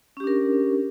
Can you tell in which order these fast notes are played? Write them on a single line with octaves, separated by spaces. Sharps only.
C#4 G4 D4 A#4